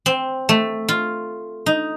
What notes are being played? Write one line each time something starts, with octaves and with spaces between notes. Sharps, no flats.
C4
A3
F4
D#4